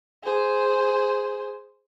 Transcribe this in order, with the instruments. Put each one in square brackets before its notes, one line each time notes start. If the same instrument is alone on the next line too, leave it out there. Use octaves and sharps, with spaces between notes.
[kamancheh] G#4 C5